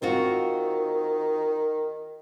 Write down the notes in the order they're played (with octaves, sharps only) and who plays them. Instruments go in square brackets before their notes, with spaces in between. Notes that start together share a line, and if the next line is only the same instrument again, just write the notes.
[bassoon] D#3 [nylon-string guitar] C4 F4 F#4